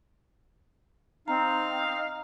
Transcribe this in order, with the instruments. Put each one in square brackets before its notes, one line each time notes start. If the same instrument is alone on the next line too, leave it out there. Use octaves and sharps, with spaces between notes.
[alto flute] C4 [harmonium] D#4 [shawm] F5 [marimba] A#5